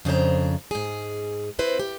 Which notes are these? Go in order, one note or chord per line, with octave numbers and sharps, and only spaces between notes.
F2 C#3 D4 C5 A#5
G#2 G#4
C4 E4 B4 C5
G4